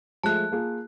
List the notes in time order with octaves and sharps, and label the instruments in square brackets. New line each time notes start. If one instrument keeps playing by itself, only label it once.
[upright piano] F3 G#3 A3 [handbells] A5 F#6
[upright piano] A#3 F4 G#4